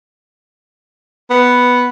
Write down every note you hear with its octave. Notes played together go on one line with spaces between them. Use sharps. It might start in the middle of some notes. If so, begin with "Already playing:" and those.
B3